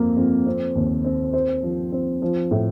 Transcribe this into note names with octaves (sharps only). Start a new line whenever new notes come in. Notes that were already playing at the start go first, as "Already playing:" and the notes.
Already playing: F2 A#3 C4
F2
C4
D#2
C4
C5
F3
C4
F3
A2